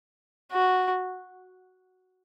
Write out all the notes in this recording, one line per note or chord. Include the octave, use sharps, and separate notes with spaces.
F#4